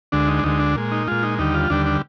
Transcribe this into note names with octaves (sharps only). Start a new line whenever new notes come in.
D2 D3 G#3 D4
D#4
D4
D2 D3 G#3 D#4
D4
A#2 G#3
D#4
A#2 G#3 F4
D#4
D#2 D3 G3 D#4
F4
D#2 D3 G3 D4
D4